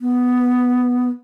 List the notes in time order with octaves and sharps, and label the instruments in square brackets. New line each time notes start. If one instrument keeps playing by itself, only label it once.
[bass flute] B3